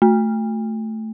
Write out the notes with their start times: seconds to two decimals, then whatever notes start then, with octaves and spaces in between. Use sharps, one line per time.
0.02 A3